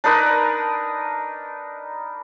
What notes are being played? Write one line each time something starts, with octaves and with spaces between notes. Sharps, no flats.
D4 D#4 A#4 B4